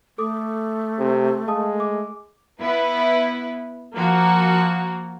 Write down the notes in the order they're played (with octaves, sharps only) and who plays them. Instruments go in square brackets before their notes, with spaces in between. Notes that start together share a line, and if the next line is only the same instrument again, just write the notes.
[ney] A3 [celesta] A4 D6 D#6
[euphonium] C3
[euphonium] G#3 [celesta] F5 A5 D#6
[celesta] D6
[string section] B3 E4 B4
F3 A#3 F#4